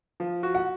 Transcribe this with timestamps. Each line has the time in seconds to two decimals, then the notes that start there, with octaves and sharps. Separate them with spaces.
0.20 F3
0.43 F#4
0.55 F#5